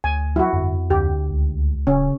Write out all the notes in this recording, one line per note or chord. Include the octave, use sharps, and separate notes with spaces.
D2 G#5
F#3 E4 F#4
G1 F2
D2 G4
C#2
D1 C#3 C#4